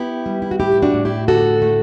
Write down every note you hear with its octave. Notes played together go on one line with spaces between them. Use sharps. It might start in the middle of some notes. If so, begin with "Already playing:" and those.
Already playing: B3 E4 G4
G3
E4
F#4
A2 E4 G4
D4 F#4
A2
E4 G4
D3 F#4 A4
A3